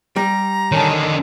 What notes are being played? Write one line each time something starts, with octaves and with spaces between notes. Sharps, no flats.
G3 A#5
D3 D#3 C#5 G#5 A5